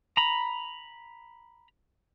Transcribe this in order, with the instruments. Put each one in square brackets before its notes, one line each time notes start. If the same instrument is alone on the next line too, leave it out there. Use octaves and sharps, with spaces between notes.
[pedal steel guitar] A#5 B5